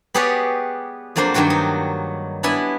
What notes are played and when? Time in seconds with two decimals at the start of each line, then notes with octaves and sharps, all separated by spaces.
0.14 B3 G4 G#4 B4 C#5 D5
1.16 F2 F#3 A#3 D4 C5
1.34 G2 D#3 F#3 F#4 G5
1.50 D#4
2.43 B3 D4 E4 G#5